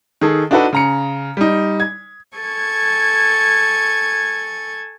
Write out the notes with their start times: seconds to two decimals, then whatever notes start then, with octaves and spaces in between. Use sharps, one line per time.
0.21 D#3 G#4 A4
0.51 D4 D#4 F#4 A4 B4
0.73 C#3 A#5 C#7
1.37 G3 D#4
1.80 G#6
2.37 A4 G#5 C#6 G#6